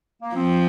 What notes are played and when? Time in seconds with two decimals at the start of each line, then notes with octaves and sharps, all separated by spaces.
0.22 A#3
0.35 F3 C4